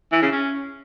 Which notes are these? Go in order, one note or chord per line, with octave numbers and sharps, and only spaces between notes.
E3
C#3
C#4